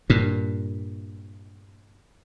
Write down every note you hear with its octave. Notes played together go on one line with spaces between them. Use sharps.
G2 A#2